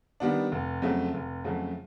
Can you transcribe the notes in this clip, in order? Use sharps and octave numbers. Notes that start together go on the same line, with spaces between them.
D#3 G3 B3 D4
F1
F2 C#3 F#3 A3
F1
F2 C#3 F#3 A3